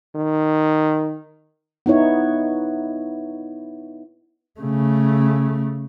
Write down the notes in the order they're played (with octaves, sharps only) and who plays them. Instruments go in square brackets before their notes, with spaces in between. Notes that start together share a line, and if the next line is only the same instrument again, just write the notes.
[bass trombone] D#3
[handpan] B3 D#4 E4 C#5
[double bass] C#3 A3